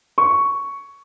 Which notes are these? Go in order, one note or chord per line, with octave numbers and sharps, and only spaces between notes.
C#6